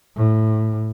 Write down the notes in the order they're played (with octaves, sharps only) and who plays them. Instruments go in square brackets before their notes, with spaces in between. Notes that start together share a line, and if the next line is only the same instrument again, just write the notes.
[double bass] A2